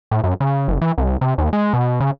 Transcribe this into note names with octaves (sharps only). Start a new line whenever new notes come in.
A2
F#2
C#3
F#1
E3
C2
C3
D#2
G#3
B2
C#3